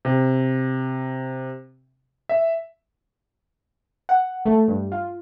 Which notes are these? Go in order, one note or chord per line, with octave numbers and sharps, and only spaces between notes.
C3
E5
F#5
A3
G2
F4